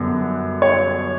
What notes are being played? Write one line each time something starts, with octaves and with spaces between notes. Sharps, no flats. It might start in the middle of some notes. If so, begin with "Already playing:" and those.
Already playing: F#2 D3 G3 B3
C#5